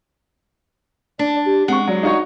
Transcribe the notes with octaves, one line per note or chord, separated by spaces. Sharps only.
D4 D5
G4
G#3 C4 F#5 C#6
F#3 D5
D#4 F#4 C#5